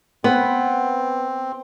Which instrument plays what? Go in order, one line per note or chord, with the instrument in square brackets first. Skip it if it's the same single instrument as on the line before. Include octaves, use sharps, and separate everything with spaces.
[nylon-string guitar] B3 [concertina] C4